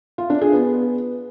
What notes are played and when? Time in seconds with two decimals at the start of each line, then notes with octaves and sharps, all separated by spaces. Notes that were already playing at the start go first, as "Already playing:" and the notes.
0.18 F4
0.30 D4
0.41 G#4
0.53 B3